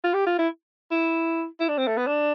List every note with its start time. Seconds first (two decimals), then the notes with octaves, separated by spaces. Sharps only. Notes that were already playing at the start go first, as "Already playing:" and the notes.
0.04 F4
0.14 G4
0.26 F4
0.39 E4
0.91 E4
1.60 E4
1.69 D4
1.78 C4
1.87 A3
1.97 B3
2.07 D4